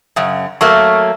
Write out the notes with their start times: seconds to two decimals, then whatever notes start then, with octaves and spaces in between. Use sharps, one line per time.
0.16 F#2 C#3
0.61 F#3 A3 A#3 C#6 E6 F6